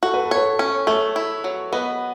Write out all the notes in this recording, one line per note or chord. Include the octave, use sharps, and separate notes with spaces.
F#4 A4
B4
A4
B4 C#5
A4
C#4
A3 A4 C#5
E4
F#3
B3 B4 D#5